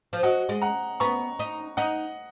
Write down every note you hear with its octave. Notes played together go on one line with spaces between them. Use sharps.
F3
F#3 D#5 F#5
G#3
F#5 A#5
B3 A#5 C#6
D#4
D#4 D#5 F#5